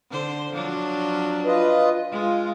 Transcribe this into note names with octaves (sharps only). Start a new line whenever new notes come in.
D3 C5
F3 F#3 D4
F4 B4 D#5
G#3 F4